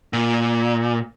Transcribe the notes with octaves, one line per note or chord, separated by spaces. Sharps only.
A#2